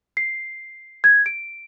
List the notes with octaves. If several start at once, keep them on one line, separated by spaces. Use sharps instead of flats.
C7
G#6
D7